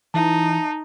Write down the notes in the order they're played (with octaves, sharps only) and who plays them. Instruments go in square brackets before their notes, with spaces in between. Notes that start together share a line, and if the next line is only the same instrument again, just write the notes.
[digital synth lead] E3 [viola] D#4 [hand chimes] E5 A5